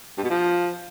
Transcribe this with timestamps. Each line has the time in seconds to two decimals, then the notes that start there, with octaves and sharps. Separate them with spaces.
0.17 G2
0.23 B2
0.29 F3